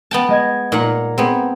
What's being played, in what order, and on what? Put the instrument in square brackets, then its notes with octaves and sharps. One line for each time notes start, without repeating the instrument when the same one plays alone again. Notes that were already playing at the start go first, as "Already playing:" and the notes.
[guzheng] B3 G5 A5
[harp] G#3 D#5 G#6
[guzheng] A#2 F#5 [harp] D#4 A#5
[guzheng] B3 C4 [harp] G#4